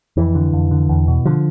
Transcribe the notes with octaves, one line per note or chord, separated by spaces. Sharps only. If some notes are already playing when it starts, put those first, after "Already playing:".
F2 E3
D3
F2
D3
E2
B2
D3 F3